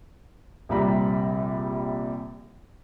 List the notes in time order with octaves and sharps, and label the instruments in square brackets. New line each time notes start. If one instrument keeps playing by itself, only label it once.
[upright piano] A#1 C3 G3 A#5 B5